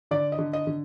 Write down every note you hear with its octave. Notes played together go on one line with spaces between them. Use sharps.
D3 D5
D#5
D3
D#5
D3